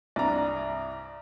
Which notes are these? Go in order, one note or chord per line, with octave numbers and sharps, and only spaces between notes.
C2 G2 D5 A#5